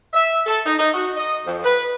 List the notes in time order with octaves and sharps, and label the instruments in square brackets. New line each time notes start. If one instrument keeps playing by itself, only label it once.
[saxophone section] E5
A4
D#4
D#4
F#4
D#5
F2
B4